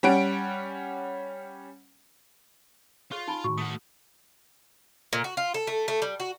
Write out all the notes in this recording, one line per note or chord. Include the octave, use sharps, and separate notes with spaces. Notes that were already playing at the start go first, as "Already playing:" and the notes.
G3 C#4 F#5 D7
F4 G#4 C#5 C#6
D#4 G#5 B5
A2 D#3 F#4 C#6
A3 F#5 D#6
A#2
F#4
F4
A4
A3
A3
G3
F#4